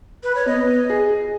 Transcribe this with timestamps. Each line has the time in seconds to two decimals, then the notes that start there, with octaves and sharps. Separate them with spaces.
0.23 B4
0.35 C#5
0.46 B3 D#5
0.90 G#4